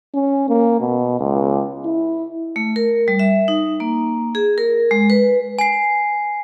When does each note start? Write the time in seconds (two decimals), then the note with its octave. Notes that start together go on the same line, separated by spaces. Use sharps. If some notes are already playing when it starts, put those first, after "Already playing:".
0.14 C#4
0.49 A#3
0.80 B2
1.19 C#2
1.85 E4
2.56 A3
2.76 A#4
3.08 G3
3.19 E5
3.48 D#4
3.80 A#3
4.35 G#4
4.58 A#4
4.91 G#3
5.10 B4
5.59 G#5 C7